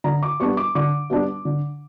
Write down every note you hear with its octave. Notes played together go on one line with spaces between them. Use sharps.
D3 A#5
D6
G3 B3 D4 C#6
D6
D3 D6
G3 B3 D4
D3